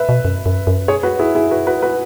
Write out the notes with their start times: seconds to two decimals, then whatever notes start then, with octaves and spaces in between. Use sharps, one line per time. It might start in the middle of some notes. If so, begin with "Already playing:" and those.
Already playing: B4 E5
0.09 B2
0.25 F#2
0.46 F#2
0.67 F#2
0.88 G#4 C#5
1.03 F#4 B4
1.19 E4 G#4
1.35 E4 G#4
1.51 F#4 B4
1.67 F#4 B4
1.82 F#4 B4